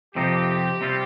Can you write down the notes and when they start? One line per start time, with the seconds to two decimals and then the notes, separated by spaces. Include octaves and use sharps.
0.15 F2 C3 F3 C4 D#4 G4
0.81 C3 G3 C4 F4